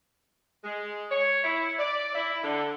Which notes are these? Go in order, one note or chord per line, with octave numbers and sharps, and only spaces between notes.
G#3
C#5
E4
D5
E4
D3